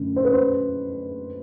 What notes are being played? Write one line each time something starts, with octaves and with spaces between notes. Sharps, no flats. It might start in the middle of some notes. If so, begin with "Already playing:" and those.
Already playing: F#2 D3 A3
C5
B4
C5